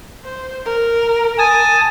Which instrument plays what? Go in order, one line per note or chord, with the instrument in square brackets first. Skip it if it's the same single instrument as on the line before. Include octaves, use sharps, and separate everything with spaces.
[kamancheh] C5
A#4
[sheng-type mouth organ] G#5 [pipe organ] A5 D#6